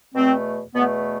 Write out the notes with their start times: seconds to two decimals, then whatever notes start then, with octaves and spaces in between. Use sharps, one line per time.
0.14 E2 B2 A3 C4
0.74 E2 B2 A3 B3